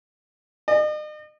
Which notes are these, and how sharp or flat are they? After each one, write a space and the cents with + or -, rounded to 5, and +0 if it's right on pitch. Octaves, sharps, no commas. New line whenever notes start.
D#5 -40